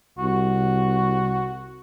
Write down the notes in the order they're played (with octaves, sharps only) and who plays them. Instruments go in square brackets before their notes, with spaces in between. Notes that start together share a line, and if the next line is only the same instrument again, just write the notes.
[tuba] C2 [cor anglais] F#4